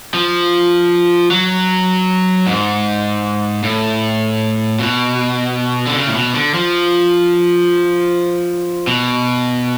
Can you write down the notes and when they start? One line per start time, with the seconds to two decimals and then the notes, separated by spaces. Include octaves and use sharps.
0.14 F3
1.30 F#3
2.47 G#2
3.63 A2
4.79 B2
5.87 D3
5.96 C#3
6.07 A2
6.15 B2
6.34 D3
6.54 F3
8.87 B2